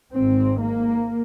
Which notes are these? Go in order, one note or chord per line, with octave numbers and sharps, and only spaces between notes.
G#1 G#2 C4
A#3